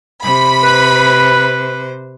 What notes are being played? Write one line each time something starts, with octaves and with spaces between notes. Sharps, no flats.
C3 C5 B5
B4